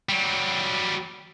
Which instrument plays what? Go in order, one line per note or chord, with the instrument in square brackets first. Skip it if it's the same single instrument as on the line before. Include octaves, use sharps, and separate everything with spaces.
[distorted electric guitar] F#3 G3